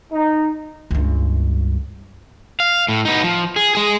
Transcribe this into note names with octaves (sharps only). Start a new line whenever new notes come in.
D#4
C#2 G2
F5
A2
B3 D#4
F3
G#4
G#3 G#4